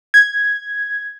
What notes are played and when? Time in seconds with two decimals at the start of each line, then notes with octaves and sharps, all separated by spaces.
0.14 G#6